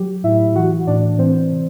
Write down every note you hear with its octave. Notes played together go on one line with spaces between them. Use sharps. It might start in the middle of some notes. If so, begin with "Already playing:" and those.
Already playing: F#3 G4
A2 E4 E5
E3 F#4 F#5
A2 D4 D5
E3 C4 C5
C3